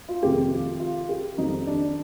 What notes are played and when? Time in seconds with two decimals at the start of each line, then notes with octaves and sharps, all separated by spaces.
0.09 F4
0.23 F2 C3 D#3 G#3 G4
0.51 F4
0.80 F4
1.09 G4
1.38 F2 D#3 G3 C4 D#4 D#5
1.67 D4 D5